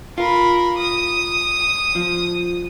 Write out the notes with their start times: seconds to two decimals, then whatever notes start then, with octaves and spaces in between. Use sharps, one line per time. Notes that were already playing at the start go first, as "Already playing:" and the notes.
0.18 F4 A#4 B5
0.78 D#6
1.96 F3